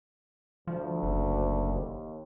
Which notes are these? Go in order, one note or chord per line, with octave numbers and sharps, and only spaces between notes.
D2 F3
F#1
D#2